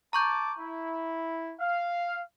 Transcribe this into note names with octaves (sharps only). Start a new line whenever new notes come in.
A5 A#5 C#6 D6 G6
E4
F5